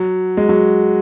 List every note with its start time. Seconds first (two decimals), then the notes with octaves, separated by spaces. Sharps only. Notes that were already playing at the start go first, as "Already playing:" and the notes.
Already playing: F#3
0.37 G#3
0.49 F#3